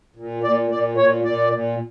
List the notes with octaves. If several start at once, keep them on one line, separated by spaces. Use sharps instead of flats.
A#2
A#2 D5
A#2 D5
A#2 C#5
A#2 D5
A#2